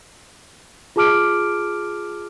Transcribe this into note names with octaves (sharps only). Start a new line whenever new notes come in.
F4 G#4 A5 D6 F6 D7